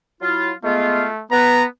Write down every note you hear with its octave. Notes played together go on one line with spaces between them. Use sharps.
F#3 E4 F4
G#3 A3 B3 F4
B3 A#5